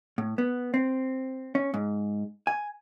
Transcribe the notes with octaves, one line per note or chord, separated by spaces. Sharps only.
A2
B3
C4
C#4
G#2
G#5